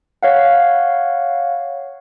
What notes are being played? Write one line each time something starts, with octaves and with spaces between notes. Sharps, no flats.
C#5 F5 F#5